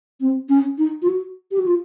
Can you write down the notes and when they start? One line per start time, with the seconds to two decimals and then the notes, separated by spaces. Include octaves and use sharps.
0.20 C4
0.49 C#4
0.78 D#4
1.02 F4
1.07 F#4
1.51 G4
1.58 F#4
1.66 F4